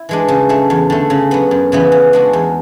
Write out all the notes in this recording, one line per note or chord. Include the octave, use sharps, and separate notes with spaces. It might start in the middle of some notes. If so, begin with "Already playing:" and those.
Already playing: E4
E3 G#3 D4
C#3
F#3 A3
E2
D3 A3
C#3
F#3 B3
F#2
C#3 E3 B3
C#3
G#3 D4 F#4
E2